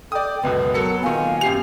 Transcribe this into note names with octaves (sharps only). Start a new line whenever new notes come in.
A4 D5 G5 D#6
C#2 F#2 B2 B3 B4
F#3 A4 A#4 C#7
A#2 D#3 F5 G#5
F#2 G4 C7 F7